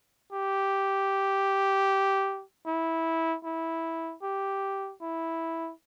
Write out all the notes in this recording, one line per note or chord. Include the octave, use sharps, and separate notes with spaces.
G4
E4
E4
G4
E4